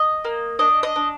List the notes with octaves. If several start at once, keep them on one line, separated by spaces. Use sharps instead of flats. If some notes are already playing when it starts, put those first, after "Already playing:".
Already playing: D#5
A#3
D4 D#5
D#5
D4